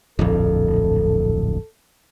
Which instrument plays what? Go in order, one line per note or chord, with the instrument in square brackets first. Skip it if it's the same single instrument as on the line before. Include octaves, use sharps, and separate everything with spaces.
[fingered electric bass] D1 A#1 F2 [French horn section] A4